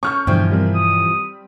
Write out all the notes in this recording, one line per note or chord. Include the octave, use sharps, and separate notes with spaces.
C#4 A4 C#6 F6 G6
G2 B2 D3 E3 F3 F4 G5
G3 C4 A#4
D#6